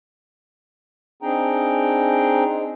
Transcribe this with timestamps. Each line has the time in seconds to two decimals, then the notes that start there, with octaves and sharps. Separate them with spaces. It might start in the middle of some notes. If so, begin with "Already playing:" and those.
1.22 C4 D4 D#4 G#4 G5 A#5